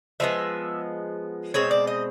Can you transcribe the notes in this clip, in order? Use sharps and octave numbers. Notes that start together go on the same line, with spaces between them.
F3 G#3 B3 E5
B2 G#3 C4 C#5
D5
D#5